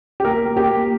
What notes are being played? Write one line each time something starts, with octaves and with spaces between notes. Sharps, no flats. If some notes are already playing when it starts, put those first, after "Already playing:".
G4
A#3 A#4
A#3
G4
A#3